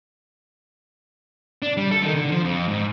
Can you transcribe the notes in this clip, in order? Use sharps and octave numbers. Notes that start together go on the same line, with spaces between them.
D4
G3
A4
D#3
D3
F3
F2
G#2